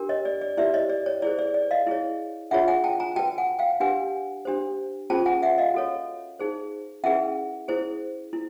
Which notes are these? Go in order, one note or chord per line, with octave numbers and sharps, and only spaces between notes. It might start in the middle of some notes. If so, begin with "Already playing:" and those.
Already playing: D4 G4 A#4
C#5 D#5
D5
D5
E4 G4 B4 D5 E5
C#5 D#5
D5
C#5
E4 G#4 C5 D5
D5
D5
D#5 F5
E4 G#4 C#5
D4 F4 G#4 C#5 E5 F#5
F#5 G#5
G5 A5
G#5 A#5
F#4 B4 G5 A5
F#5 G#5
F5 G5
D4 G4 B4 F#5 G#5
D4 G4 C5
C#4 F4 G#4 C5 G5 A5
F#5 G#5
E5 F#5
D#5 F5
F#4 A4 C#5
D#4 G#4 C5
C#4 E4 G#4 B4 E5 F#5
E4 G#4 C5
E4